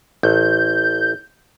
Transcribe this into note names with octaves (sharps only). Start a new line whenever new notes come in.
A1 G6